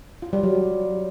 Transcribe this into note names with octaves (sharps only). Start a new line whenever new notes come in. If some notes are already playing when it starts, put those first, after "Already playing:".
F4
G3
F#3